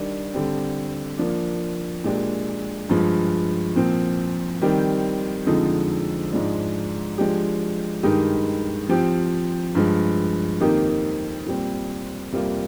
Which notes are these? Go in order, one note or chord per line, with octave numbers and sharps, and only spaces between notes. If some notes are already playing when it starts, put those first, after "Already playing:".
Already playing: D#3 G3 D4
D3 G3 C4
F3 A#3 D4
A#2 G#3 D4 G4
G2 F3 G#3
A#2 F3 C4
D#3 G3 C4 G4
F2 D3 F3 G#3 D#4
G#2 F3 G#3 D4
F3 G#3 D4 G4
G2 D#3 G#3 D#4 G4
F3 C4 G4
G2 F3 G#3
F2 D#3 A#3 D#4 G4
A#2 G3 C4
F2 C3 G3 A#3 F4